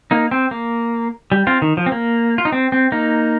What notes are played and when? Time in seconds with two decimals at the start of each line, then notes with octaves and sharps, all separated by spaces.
0.11 A#3 D#4
0.31 C4
0.51 A#3
1.32 G3
1.47 C4 F4
1.62 D#3
1.77 F3
1.86 C4
1.92 A#3
2.38 F4
2.45 D#4
2.52 C4
2.72 C4
2.92 A#3 D#4